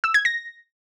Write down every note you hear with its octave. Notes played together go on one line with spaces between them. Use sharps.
E6
G#6
A#6